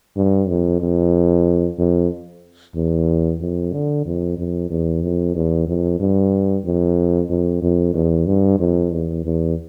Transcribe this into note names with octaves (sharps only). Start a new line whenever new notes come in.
G2
F2
F2
F2
E2
F2
D3
F2
F2
E2
F2
E2
F2
G2
F2
F2
F2
E2
G2
F2
E2
E2